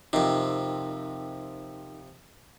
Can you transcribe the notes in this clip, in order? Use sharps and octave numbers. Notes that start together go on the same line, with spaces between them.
F2 C3 D#4 A#4